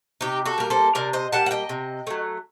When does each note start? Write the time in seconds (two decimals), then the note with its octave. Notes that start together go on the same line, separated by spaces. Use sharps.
0.21 C3 D#4 G4
0.46 F#4 A4
0.58 G3 A#3 A#4
0.70 A4 C5
0.95 C3 A#4 D5
1.13 C5 D#5
1.32 G3 A#3 F#5 A5
1.46 F#5
1.51 D#5 G5
1.69 C3
2.07 F#3 A3